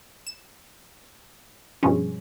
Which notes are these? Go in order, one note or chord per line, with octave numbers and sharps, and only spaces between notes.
E7
G2 B2 F3 G#3 C#4